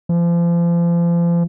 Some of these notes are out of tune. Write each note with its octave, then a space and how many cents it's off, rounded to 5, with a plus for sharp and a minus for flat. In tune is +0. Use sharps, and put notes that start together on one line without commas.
F3 -35